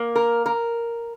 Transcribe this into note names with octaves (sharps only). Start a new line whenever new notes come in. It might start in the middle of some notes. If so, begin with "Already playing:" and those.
Already playing: A#3
A#4
A#4